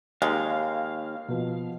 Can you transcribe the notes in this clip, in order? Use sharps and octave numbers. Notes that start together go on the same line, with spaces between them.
D#2 G#3 F5
B2 F3